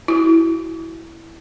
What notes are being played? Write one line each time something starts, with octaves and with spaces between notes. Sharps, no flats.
E4 F#4